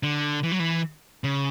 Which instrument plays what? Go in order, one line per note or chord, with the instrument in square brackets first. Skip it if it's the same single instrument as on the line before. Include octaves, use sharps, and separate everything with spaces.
[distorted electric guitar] D3
E3
F#3
E3
C#3